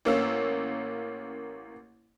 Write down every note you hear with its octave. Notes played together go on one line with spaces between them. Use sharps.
A1 A#3 C#4 E6